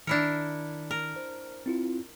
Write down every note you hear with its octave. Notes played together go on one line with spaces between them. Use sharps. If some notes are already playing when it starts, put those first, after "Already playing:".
D#3 D4 E4 A#4 C#7
A#4
C5
C4 E4 F4